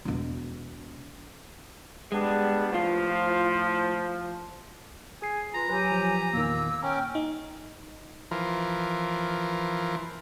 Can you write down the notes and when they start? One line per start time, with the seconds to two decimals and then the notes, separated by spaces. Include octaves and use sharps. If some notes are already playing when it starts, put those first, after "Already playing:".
0.05 E1 B2
2.12 G3 G#3 B3 D4
2.72 A2 F3 F4
5.22 G#4 G#5 C7
5.54 F4 B4 A#5
5.70 F#3 G4 B4 G#5
5.92 F3
6.33 E2 A#2 D#3 A#3 E6
6.83 C#4 G5 A#5 F6
7.15 D#4
8.31 E3 F3 A#4